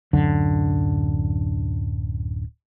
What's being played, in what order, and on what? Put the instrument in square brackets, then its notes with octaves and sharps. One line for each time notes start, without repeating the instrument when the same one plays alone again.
[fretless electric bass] D1 F#2 D3